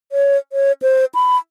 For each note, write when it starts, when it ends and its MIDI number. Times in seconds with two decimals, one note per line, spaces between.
0.12 0.37 73
0.53 0.72 73
0.82 1.05 72
1.15 1.37 83